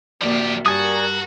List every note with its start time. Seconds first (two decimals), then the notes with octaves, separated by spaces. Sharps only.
0.21 D1 F3 A#3 G4 D5 E5
0.66 G2 F#4 A#4 D5 G#5 D#6